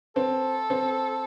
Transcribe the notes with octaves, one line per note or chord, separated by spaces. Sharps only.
C4 A4
C4